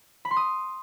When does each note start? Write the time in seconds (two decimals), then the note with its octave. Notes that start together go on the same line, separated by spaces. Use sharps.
0.25 B5
0.31 C6
0.37 D#6